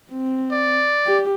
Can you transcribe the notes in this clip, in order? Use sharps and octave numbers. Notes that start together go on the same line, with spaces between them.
C4
D5
G4